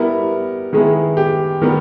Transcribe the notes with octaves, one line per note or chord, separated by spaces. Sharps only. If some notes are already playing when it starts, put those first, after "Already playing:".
Already playing: G3 B3 E4 A#4
D#3 G#3 B3 E4 G#4
G4
D#3 G3 B3 A#4